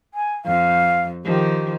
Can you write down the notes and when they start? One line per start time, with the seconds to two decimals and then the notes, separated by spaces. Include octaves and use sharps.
0.14 G#5
0.45 F2 F5
1.25 D#3 F3 G4